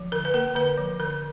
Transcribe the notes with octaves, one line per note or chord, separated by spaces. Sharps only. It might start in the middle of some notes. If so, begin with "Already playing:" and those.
Already playing: F3
D3 A#4
B4
A#3 A#4
D3 B4
F3
D3 A#4